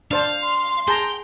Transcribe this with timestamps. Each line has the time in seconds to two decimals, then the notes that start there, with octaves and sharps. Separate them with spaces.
0.11 D4 C5 F5 A5
0.44 C6
0.88 G#4 G5 A5 A#5